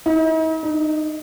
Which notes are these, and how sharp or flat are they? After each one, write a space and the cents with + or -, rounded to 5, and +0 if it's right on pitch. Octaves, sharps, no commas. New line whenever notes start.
D#4 +45
D#4 -20